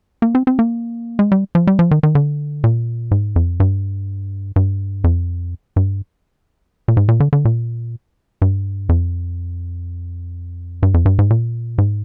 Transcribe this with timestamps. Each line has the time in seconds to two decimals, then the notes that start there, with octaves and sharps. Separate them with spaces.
0.22 A#3
0.35 C4
0.47 C4
0.59 A#3
1.19 G#3
1.32 G3
1.55 F3
1.67 G3
1.79 F3
1.91 D#3
2.03 D#3
2.15 D3
2.64 A#2
3.11 G#2
3.36 F2
3.60 G2
4.56 G2
5.04 F2
5.76 G2
6.88 A#2
6.97 G#2
7.08 A#2
7.20 D3
7.33 D3
7.45 A#2
8.42 G2
8.89 F2
10.83 G2
10.94 F2
11.05 G2
11.19 G#2
11.30 A#2
11.78 G#2